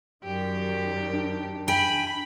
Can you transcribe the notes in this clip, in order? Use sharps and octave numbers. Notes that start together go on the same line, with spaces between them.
F#2 D#3 G3 G4
D4
G5 G#5 B5